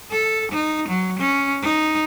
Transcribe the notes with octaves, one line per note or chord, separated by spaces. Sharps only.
A4
D#4
F#3
C#4
D#4